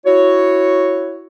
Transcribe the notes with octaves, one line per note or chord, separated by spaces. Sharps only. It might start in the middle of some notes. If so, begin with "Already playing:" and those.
E4 F#4 C#5